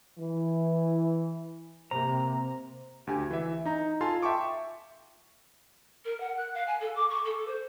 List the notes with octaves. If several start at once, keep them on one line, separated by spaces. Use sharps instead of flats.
E3
C3 A#3 C5 A#5
D2 G4 G#5
E3 E5
D#4 A#5
F4 A4 F5 G#5 A5 C6
E5 G5 A5 C#6 D6
A#4
F#5
F#6
F5
G#5
A4
D6
C#6
A4
C5